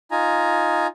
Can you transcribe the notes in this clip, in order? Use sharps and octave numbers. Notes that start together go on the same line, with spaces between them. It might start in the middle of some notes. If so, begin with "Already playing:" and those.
D#4 F4 G#5 A#5